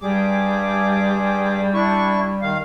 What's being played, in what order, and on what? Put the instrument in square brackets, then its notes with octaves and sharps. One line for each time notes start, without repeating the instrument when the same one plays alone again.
[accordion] G2 G#4 D6 [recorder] G3
[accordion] D4 E4 C#6
D#3 F5